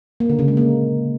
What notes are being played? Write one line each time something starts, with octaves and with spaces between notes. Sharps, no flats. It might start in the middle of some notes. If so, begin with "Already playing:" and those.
A#3
D3
C#3
G#3
A#3